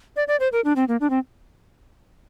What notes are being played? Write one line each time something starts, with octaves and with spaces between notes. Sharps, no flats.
D5
D5
C5
A#4
D4
C4
A#3
D4
C4